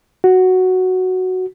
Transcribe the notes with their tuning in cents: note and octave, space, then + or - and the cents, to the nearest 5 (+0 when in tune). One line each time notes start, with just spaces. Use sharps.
F#4 +0